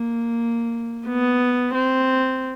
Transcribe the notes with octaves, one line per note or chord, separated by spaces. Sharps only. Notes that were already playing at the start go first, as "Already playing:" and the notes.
Already playing: A#3
B3
C4